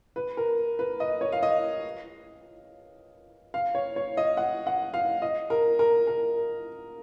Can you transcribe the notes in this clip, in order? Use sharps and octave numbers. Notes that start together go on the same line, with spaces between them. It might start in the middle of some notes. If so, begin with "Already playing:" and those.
B4
A#4
B4
D#5
C#5
F5
D#5
F5
C#5
C#5
D#5
F#5
F#5
F5
D#5
A#4
A#4
A#4